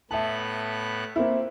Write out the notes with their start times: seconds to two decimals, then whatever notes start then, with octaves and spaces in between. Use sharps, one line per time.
0.11 A2 B3 E5 A5 F#6
1.16 A#3 C4 E4